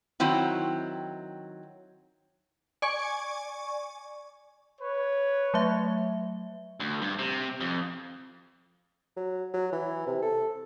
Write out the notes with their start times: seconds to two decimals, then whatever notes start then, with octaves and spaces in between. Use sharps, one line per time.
0.20 D#3 F#3 C4 E4
2.82 D5 G#5 C#6
4.81 B4 C#5
5.54 F#3 A3 E5
6.80 D2
7.02 G2
7.19 C3
7.60 F2
9.17 F#3
9.53 F#3
9.72 E3
10.07 C3
10.22 A4